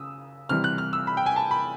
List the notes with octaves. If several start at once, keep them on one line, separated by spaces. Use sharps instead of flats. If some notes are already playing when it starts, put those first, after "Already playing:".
Already playing: C#3 D#6 E6
C3 E3 G3 F6
F#6
F6
E6
B5
G5
G#5
A5
B5